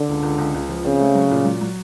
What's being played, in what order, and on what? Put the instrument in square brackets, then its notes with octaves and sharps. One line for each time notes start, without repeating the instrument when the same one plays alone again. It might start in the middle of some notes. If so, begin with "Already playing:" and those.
Already playing: [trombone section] D3
[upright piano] C#2
C#2
C#2
C#2
F3
[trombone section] C#3 [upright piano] C4
[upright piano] A3
F#3
A#2
F#3
F#3